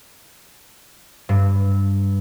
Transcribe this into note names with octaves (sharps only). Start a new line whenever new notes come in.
G2